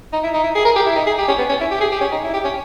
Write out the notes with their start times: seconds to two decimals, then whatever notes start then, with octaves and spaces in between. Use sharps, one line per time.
0.13 D#4
0.24 E4
0.34 D#4
0.44 E4
0.55 G#4
0.65 A#4
0.76 G4
0.86 E4
0.96 D#4
1.07 G#4
1.18 G4
1.28 C#4
1.38 B3
1.49 C#4
1.61 E4
1.71 G4
1.81 G#4
1.92 G4
2.01 C#4
2.12 D#4
2.24 E4
2.34 G4
2.45 C#4